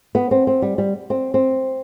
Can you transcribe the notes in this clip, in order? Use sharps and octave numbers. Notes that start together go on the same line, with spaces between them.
B3
C4
C4
G3
G3
C4
C4